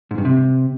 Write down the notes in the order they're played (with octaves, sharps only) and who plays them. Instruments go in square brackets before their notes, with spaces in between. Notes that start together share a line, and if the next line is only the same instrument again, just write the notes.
[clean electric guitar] G#2
G2
C3